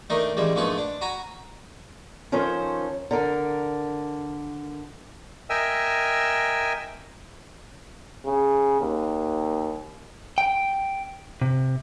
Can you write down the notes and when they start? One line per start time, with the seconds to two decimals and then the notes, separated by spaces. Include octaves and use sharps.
0.10 D#3 A3 D4 D#4
0.37 A1 G3 G#3
0.56 A#1 G#2 A3 B4 C#6
0.78 D4
1.01 F#4 G#5 A#5 B5
2.32 D#3 F3 C#4 A4 C5 C#5
3.11 D3 A#4 D5
5.50 A#4 D#5 E5 G5 G#5 E6
8.26 C#3
8.81 D#2
10.38 G5
11.42 C3